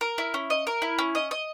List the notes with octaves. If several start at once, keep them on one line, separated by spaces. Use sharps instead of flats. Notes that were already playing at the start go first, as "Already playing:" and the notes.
A#4
E4
C#4
D#5
A#4
E4
C#4
D#5
D#5